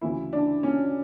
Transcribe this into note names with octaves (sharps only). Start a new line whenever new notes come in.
D2 C#3 E3 E4
D4
C#4